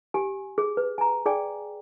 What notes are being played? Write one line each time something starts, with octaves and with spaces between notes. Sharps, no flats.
G4 G#5
G#4
B4
G#5 A#5
G#4 D5 G5 G#5